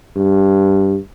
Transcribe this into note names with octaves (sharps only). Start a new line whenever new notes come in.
G2